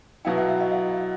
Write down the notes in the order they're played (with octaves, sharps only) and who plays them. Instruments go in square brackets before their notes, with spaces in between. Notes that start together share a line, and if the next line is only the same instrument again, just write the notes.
[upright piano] B2 F#3 B3 E4 [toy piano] F5 G5
[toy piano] E5 F#5
E5 F#5
D#5 F5
D#5 F5